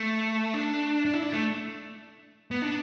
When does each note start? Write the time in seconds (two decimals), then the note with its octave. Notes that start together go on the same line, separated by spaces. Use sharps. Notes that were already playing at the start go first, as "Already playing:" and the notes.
Already playing: A3
0.54 D4
1.06 D4
1.14 E4
1.23 D4
1.33 A3
2.51 B3
2.62 D4